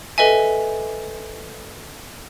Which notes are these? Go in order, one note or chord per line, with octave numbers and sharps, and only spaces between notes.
A4 B4 D#5 E5 G#5